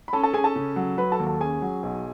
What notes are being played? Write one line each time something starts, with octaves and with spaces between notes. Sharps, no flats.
B5
C#4 A4 A5
A4 A5
C#4 G#4 G#5
A4 A5
C#3
F#3
F#3 B4 B5
A4 A5
D#2
A4 A5
C#4 G#4 G#5
F#3
B1